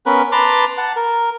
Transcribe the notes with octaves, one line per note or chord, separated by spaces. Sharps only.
B3 C#4 A#4 B4
B4 A5 A#5 C6 D6
F#5 A5
A#4